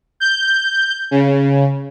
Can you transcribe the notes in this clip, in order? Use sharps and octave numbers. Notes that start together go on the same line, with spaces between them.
G6
C#3